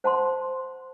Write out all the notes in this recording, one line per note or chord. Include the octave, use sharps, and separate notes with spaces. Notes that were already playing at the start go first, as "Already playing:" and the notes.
C5 F#5 A5 C6